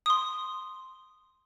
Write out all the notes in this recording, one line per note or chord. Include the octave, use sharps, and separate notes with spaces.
C6 D#6